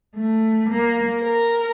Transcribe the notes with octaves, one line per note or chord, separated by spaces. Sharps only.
A3
A#3
A#4